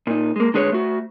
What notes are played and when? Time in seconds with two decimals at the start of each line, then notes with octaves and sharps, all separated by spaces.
0.07 A#2 D#4
0.36 G#3 A#3
0.54 D3 G#3 G#4 B4 C#5
0.72 A3 F#4